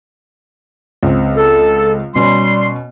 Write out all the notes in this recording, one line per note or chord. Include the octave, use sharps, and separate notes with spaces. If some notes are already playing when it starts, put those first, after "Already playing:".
C#2 C4
A4
B2 G3 C#4 C6